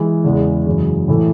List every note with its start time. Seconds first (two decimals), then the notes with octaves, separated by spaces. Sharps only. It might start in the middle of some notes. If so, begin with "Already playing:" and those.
Already playing: E3 G#3
0.24 E2 C#3 E3 G#3
0.66 F#2 C#3 E3 G#3
1.08 A2 E3 A3 E4